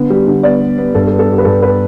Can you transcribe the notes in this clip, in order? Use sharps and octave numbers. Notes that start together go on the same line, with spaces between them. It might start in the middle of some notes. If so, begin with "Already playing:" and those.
Already playing: D3 B3
G3
D3
B3 D5
B3
B3
G2 A4
A4
B3
A4
B3 G4
B4
G2 A4
B3 B4